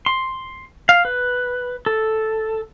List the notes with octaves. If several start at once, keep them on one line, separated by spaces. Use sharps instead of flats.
C6
F5
B4
A4